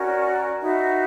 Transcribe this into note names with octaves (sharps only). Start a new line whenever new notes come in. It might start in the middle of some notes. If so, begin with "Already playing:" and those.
Already playing: C#4 F#4 A#4 D5
D#4 F#4 B4 E5